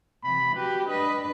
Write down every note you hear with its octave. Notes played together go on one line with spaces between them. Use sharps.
C3 E3 B5
F#4 G4 B4
D4 B4 D#5